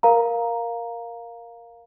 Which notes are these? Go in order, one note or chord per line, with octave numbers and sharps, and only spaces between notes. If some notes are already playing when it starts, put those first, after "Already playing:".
A#4 F5 A#5